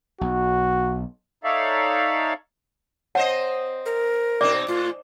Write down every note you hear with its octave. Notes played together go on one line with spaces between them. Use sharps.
B1 F#4
D#4 A4 C#5 D5 E5 F5
C4 C5 C#5 D#5 F#5 A5
A#4
B2 C4 D#4 D5 E5 D6
A2 F4